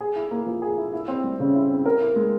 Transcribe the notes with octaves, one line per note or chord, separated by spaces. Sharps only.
G#4
E4
A#3
F3
G#4
E4
E4
C4
G3
C#3
E4
C4
A#4
E4
G#3